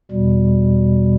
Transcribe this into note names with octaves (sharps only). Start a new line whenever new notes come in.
E2 B2 G3